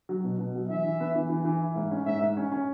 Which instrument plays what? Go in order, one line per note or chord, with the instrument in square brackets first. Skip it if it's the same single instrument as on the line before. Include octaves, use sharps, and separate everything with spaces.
[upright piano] F#3
B2
B2
F#3
[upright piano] E3 [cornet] E5
[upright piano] E3
B3
E3
E3
E3
E4
G#2
C#4
[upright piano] G#2 [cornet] E5
[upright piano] G#2
C#4
C#4